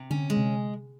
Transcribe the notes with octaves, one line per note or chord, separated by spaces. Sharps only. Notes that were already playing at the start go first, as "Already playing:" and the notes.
Already playing: C3
D3 C#4
G#3
C3